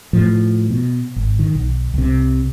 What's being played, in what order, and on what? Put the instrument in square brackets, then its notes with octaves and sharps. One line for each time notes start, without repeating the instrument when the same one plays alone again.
[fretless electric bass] A2 F3
B2
G#1
D#3
B1
C2 C3